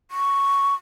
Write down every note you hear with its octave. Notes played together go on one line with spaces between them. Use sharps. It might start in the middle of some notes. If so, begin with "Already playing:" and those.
C#6